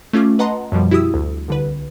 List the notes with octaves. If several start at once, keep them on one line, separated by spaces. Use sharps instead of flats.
A3 C#4 F4 D6
B4 D#5 F#5 A5 A#5 C6
F#2 B2 F3 G3
E4 F#4 G4 D#6 E6
D2
C2 D3 B4